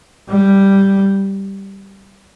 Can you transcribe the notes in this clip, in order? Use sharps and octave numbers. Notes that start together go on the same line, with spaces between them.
G3